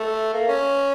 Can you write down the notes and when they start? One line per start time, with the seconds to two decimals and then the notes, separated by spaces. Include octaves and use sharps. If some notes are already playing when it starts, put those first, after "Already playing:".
Already playing: A3
0.34 A#3
0.48 C#4